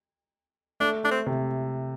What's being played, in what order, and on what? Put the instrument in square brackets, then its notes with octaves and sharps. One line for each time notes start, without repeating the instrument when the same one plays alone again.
[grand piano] A3 [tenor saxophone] D4
[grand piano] A3 [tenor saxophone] D4
[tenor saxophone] C4
[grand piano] C3